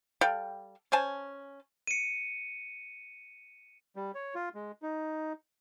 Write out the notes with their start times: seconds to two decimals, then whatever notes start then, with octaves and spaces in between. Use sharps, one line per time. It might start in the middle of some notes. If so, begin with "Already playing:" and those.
0.21 G3 A4 F5 G5
0.92 C#4 C5 G#5 A5
1.87 C#7 D#7
3.96 G3
4.15 C#5
4.35 F4
4.55 G#3
4.82 D#4